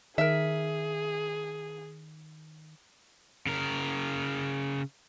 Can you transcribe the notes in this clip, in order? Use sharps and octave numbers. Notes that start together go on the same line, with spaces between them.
D#3 G#4 A#4 E5
C#3 A#4